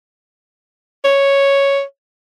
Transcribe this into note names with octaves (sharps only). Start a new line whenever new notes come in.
C#5